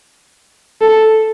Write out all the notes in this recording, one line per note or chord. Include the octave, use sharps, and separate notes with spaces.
A4